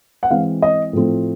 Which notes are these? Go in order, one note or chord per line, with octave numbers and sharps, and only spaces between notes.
F#5
E3 G#3 C4 F5
D#5
A2 F3 A3 C4